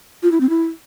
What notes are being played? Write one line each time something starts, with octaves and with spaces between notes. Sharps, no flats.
F4
E4
C4
E4